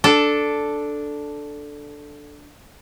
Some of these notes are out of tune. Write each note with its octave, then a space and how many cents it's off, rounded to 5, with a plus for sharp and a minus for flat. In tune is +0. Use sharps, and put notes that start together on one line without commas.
D4 +0 A4 +0